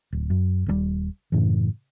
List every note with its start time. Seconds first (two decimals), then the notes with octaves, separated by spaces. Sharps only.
0.13 D1
0.30 F#2
0.66 D#1 B2 G3
1.32 F#2 A2 C#3 E3